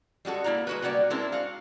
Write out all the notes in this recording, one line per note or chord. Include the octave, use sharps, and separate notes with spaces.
G3 G#3 F#4 A4
A#3 E4 D5 A#5
G#3 F#4 B4
G3 A#3 B3 F#4 D5
G#3 C4 D4 E4 A#4
F#4 F5